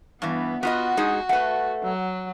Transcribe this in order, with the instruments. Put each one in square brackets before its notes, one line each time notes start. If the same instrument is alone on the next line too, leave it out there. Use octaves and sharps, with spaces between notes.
[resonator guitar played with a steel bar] G2 E3 [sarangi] B3
[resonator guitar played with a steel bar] B3 F4 D#5 [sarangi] F#4
[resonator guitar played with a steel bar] G#3 D#4 G#4
[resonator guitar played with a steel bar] A3 B4 [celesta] F#5
[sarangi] F#3